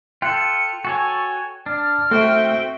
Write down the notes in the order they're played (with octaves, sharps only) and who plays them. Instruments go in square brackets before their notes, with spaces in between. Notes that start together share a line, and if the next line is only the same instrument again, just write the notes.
[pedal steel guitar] F4 A4 [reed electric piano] G5 F#6 [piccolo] C#7
[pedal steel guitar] F#4 A4 C#5 [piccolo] G#5
[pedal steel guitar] D4 [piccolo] F6
[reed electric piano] A3 [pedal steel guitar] C4 F#4 [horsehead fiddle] E5 G5